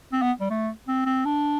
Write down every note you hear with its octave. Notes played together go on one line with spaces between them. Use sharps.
C4
B3
G3
A3
C4
C4
D4